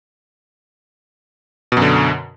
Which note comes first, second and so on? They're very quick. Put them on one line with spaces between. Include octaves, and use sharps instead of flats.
B2 F#2 D3